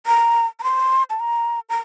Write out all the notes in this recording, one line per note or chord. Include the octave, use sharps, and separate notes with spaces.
A#5
A#5
C6
A5
A#5
A#5